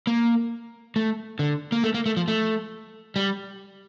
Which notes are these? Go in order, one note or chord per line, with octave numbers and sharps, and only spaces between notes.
A#3
A3
D3
A#3
A3
A#3
A3
F3
A3
G3